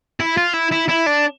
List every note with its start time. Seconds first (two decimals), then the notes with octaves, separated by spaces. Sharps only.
0.20 E4
0.37 F4
0.54 E4
0.71 E4
0.88 E4
1.06 D4